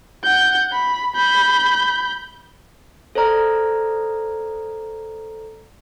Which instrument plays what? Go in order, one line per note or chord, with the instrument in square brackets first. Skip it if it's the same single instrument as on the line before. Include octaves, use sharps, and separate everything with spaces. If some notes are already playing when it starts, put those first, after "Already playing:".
[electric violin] F#5 G6
B5
B5 G6
[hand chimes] A4 C5 D5 A#5 F6